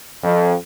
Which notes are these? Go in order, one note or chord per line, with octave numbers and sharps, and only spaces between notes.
F2